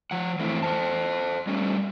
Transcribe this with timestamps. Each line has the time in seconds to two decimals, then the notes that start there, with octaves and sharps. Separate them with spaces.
0.11 F3 F#5
0.39 E2 A3 C4 E4
0.63 A4 C5 A5
1.47 G3 A3 C#4